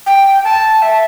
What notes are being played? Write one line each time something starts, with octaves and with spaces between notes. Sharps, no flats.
G5
A5
E5